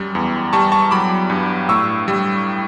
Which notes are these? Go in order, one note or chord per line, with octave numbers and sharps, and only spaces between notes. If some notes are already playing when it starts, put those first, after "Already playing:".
Already playing: F#2 G3
E2
G3 A5 C#6
A5 C#6
C#6
F#3 B5 D6
G2
A2 C#6 E6
G3